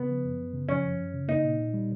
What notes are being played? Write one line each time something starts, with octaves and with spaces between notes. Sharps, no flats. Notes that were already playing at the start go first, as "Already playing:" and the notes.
Already playing: C#3 B3
F3
F#2
F#2
C#3
F3 C#4
F#2
F#2
C#3
A#3 D#4
A#2
A#2
G3